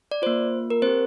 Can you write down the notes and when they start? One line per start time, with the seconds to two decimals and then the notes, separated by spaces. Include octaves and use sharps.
0.11 D5
0.22 A#3 F4 C5
0.70 A#4
0.82 C4 C5
0.87 G4